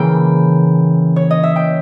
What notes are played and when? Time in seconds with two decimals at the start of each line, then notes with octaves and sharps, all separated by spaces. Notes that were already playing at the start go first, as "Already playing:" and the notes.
Already playing: C#3 E3 A#3 G5
1.16 C#5
1.31 D#5
1.43 E5
1.56 G5